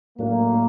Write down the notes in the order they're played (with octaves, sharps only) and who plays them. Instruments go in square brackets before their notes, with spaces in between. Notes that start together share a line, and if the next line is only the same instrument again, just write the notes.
[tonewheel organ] A2 F#3 A3 D4 [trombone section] A#3